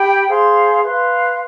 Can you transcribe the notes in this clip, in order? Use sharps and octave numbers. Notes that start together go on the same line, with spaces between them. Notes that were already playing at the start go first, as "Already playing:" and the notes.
Already playing: G4 G5 B5
G#4 C5 F5 C6
B4 F5 C6